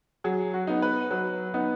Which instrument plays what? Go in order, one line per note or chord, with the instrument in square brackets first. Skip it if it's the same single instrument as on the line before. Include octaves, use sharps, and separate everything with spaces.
[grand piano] F#3 G#4
F#4
B3 D#4
B4
F#3 B4
B3 D#4